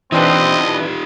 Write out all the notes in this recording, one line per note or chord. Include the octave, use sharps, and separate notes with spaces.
E3 C4 D4 D#4 F4 G4 B4 D#5